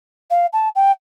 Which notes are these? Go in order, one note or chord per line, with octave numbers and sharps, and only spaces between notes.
F5
A5
G5